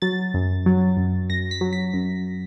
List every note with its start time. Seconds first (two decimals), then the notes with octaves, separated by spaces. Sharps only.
0.02 F#3 A6
0.34 F#2
0.66 F#3
0.97 F#2
1.30 F#2 A#6
1.51 B6
1.61 F#3
1.73 B6
1.93 F#2